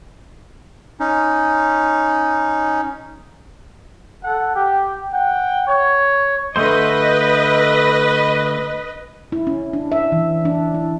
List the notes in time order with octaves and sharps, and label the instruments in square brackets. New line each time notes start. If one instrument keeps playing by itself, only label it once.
[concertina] C#4 D#4
[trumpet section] A4 F#5
G4
F#5 G5
C#5
[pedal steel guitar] D3 A3 C5 [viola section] B4 D#5
[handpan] E4
C#4
D4
E5
E3
D4
E4